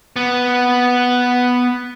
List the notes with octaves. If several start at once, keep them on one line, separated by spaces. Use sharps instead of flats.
B3